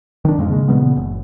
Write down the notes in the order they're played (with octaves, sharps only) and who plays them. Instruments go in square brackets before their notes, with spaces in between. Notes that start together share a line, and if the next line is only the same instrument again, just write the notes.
[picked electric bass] D#3 D4
F2 A2 G#3 A#3
C#3 G#3
A#2 C#3 E3 B3
F#1